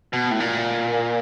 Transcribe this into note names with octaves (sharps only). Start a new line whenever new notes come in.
B2
A2
A#2